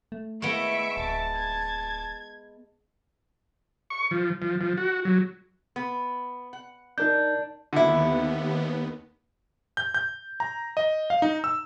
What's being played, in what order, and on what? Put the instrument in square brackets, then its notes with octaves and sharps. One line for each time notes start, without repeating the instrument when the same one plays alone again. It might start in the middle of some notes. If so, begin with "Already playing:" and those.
[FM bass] A3
[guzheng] G#3 B3 [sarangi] E4 [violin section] E5 C#6 D7
[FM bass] D1 [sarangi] A5
[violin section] G#6
[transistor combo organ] C#6
F3
F3
F3
F#4
F#3
[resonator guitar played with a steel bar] B3
F#5
[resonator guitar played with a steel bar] D4 [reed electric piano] D#4 A#4 G6
[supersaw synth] D#2 B3 [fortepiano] D3 E4
[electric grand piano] G6
G6
A#5
D#5
F5
D#4
E6